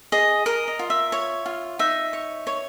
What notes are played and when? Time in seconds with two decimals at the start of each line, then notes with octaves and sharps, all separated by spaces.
0.12 G#4 D#5
0.46 A#4 D#5
0.68 D#5
0.79 F4
0.90 E5
1.12 C#5
1.46 F4
1.79 D#4 E5
2.13 C#5
2.47 C#5